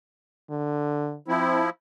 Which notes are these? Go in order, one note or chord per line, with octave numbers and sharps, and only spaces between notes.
D3
F3 C4 E4